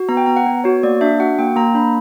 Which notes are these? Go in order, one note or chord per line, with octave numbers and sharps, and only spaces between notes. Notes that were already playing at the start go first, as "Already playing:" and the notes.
Already playing: F#4
B3 A#5
G5
B3 A#5
F#5
B3
F#4 C#5
A#3 D5
D4 E5
F#4 F#5
A#3 G5
A#3 A#5
D4 B5